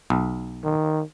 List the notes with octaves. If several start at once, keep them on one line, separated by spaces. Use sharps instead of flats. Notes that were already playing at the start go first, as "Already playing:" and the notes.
B1
D#3